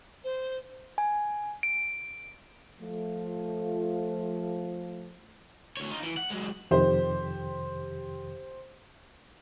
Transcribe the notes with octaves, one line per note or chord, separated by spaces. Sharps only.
C5
G#5
D7
F3 A3
D2 C#5
D#4 F4
E3
F#5
F#3 G#3
F2 C3 D#3 G4 C5